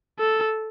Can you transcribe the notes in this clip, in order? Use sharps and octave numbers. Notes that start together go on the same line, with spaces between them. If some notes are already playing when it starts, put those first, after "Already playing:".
A4